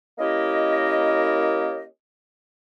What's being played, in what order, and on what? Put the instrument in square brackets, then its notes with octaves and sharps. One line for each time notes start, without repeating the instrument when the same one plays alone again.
[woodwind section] A#3 C#4 E4 G4 A#4 D#5